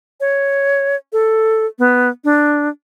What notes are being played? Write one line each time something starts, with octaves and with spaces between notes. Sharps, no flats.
C#5
A4
B3
D4